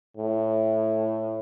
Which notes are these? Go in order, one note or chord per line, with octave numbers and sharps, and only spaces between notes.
A2